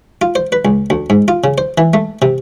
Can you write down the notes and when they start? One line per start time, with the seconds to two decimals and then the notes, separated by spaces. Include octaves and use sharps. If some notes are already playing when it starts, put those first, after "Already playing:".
0.22 F4
0.35 C5
0.52 B4
0.65 C#2
0.90 D2
1.10 G#2
1.28 F4
1.44 C#3
1.58 C5
1.78 E3
1.94 A3
2.22 C3